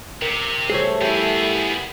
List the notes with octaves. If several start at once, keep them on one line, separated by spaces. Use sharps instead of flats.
C3 A#4
G3 A3 G#4 A4 C5 C#5
B3 E4 G4 G#4